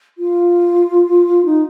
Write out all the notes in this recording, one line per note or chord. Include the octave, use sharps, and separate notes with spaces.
F4
D#4